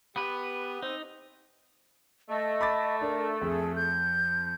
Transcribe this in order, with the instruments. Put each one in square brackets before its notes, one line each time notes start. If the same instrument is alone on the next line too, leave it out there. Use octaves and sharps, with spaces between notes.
[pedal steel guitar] B3 B4 [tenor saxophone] G4
[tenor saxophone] C4 [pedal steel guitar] D#4
[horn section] A3 [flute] D#5
[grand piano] B5 D6 A6
[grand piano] D4 [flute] A#4
[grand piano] F2 [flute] G#4
[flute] G6